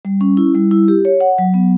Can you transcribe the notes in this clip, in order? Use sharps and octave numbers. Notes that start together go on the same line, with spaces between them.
G3
C#4
E4
G3
E4
G4
C#5
F#5
F#3
B3